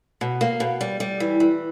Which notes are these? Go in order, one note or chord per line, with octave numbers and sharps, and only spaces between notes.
B2
A#3
B2
G3
G3
E3
E3